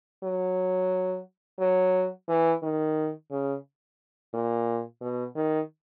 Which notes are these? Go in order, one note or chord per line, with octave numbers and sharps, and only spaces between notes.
F#3
F#3
E3
D#3
C#3
A#2
B2
D#3